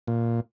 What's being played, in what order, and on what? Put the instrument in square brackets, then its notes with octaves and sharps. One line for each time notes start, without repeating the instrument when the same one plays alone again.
[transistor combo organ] A#2